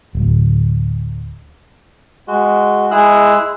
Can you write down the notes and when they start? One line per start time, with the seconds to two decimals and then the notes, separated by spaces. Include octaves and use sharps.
0.15 D1
2.28 G#3 F#4
2.91 G#3 E4 G#4 E6 F#6